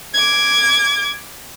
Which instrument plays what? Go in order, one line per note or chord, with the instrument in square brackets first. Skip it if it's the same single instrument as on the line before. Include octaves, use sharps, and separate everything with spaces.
[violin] D6 G#6